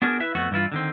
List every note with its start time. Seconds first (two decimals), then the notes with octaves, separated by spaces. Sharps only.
0.02 B3 D4 F#4 G#4 A#4
0.20 E4 B4 E5
0.35 F2 A3 B3 F#4
0.51 G2 E3 E4 F4
0.72 D3 D#3 C4